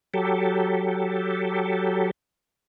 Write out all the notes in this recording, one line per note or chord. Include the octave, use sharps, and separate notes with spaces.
F#3 G4 A4